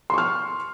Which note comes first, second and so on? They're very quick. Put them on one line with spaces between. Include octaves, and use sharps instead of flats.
C6 C#6 F6